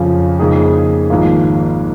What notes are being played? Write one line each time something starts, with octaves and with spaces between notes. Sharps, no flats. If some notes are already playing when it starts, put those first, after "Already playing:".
Already playing: F2 C#3 F3 C#4 F4
F2 C#3 A#3 D#4 G#4
G#1 G#2 F3 A#3 F4